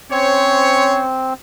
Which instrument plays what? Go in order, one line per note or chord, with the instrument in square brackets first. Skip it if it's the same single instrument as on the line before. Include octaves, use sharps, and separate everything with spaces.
[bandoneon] C4 [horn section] C#4 C5 C#5